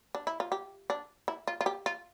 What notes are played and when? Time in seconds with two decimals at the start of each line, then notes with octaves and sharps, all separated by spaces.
0.15 D4
0.27 E4
0.40 F4
0.52 G4
0.90 D4
1.28 E4
1.48 F4
1.61 F4
1.66 G4
1.86 F4